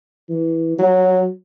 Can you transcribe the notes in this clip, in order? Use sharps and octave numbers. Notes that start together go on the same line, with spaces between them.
E3
F#3